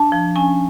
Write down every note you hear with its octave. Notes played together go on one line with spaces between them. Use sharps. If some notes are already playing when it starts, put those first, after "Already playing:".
Already playing: D4 A5
F3
C#4 G#5